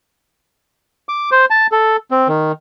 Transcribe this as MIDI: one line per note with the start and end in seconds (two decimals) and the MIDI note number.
1.09 1.30 86
1.32 1.45 72
1.50 1.67 81
1.72 1.96 69
2.11 2.28 60
2.28 2.52 51